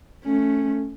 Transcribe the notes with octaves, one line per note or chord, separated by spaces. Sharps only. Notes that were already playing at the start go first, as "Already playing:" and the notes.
A3 C#4